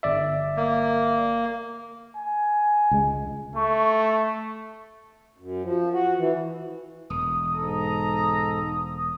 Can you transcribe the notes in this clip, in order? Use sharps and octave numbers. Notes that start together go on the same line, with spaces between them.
G1 D5 E5
A#3
G#5
C#2 G#3
A3 C#6
F#2
F3
F#4
E3
E1 D#6
G#2 A4 A#5